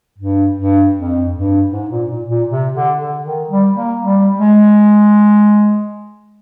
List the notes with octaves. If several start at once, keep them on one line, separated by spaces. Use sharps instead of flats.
G2
G2
F2
G2
G#2
A#2
A#2
A#2
C3
D3
D3
D#3
G3
A#3
G3
G#3